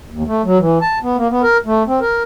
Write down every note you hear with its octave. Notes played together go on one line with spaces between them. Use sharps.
D#2
A3
F#3
E3
A5
B3
A#3
B3
A#4
A3
C4
A#4